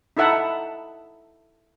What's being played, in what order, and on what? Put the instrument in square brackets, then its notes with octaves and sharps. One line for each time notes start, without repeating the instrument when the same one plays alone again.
[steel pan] D#4 E4 A4 E5 F#5 A5